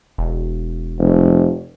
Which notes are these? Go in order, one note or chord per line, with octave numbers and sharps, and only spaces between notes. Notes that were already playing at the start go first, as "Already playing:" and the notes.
E1
F1